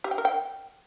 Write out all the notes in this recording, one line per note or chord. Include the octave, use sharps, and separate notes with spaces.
G4
G5
A#4
G5